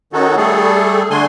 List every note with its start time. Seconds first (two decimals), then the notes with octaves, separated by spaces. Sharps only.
0.13 D#3 C#4 D#4 F#4 A4
0.37 G3 A3 G#4 A4
1.11 D3 A3 D4 G#5 C6